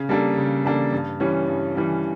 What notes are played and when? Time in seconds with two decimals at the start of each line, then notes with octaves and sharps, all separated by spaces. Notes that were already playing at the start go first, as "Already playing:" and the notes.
Already playing: C#3
0.09 G3 A#3 D4 A4
0.37 C#3
0.65 G3 A#3 D4 A4
0.93 G2
1.20 E3 G3 C#4
1.48 G2
1.76 E3 G3 C#4